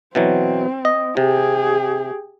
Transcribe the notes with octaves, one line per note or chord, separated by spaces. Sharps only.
B2 E3 F#3 C4
D#5
C3 G4 G#4